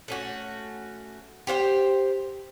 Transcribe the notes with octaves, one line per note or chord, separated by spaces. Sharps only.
A3 C#4 F#4
G4 C5 F5 G5